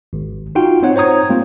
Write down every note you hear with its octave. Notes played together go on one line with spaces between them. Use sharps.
G#1
D#4 F4 F#4 G5
C4 D#4 C#5 F#5
C5 C#5 A#5 D#6 G#6
G3 A#3 C4 F4